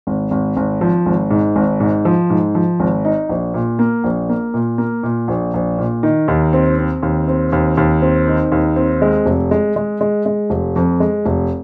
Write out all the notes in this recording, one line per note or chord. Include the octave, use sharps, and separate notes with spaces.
G#1
G#1
G#1
F3
G#1
G#2
G#1
G#2
F3
G#2
F3
G#1
D#4
A#1
A#2
A#3
A#1
A#3
A#2
A#3
A#2
A#1
A#1
A#2
D#3
D#2
C4
C4
D#2
C4
D#2
D#2
C4
D#3
D#2
C4
G#3
F1
G#3
G#3
G#3
G#3
F1
F2
G#3
F1